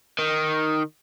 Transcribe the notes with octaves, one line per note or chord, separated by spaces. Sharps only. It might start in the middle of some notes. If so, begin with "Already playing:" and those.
D#3